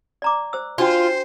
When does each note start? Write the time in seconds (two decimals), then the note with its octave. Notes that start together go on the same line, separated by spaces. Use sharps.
0.22 D5 A#5 D6
0.53 C5 E6
0.78 D4 F4 F#4 C5 G5